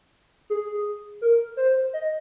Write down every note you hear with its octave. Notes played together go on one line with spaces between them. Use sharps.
G#4
A#4
C5
D#5